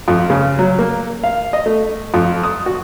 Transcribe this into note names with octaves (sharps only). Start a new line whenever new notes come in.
F2
C#3
F#3
A#3
F5
D#5
A3
F2
D#6
F#4